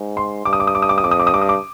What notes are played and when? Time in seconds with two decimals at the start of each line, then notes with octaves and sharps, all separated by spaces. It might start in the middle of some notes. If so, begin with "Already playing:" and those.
Already playing: G#2
0.17 C6
0.45 G2 D6
0.53 D#6
0.60 D6
0.67 D#6
0.75 D6
0.82 D#6
0.89 D6
0.98 D#6
1.03 F2 D6
1.11 D#6
1.20 D6
1.27 D#6
1.33 G2 D6
1.42 D#6
1.49 D6